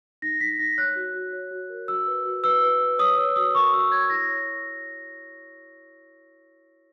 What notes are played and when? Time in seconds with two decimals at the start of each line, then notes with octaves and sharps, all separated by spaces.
0.22 D#4 A#6
0.41 D#4 B6
0.59 D#4 A#6
0.78 C#5 F#6
0.96 F#4
1.14 F#4
1.33 C#5
1.51 F#4
1.70 A#4
1.88 F#4 E6
2.07 B4
2.25 F#4
2.43 B4 E6
2.62 B4
2.81 B4
2.98 C#5 D#6
3.17 C#5 E6
3.36 F#4 D#6
3.54 A#4 C#6
3.73 F#4 E6
3.91 C#5 G#6
4.10 E4 A#6
4.28 C#5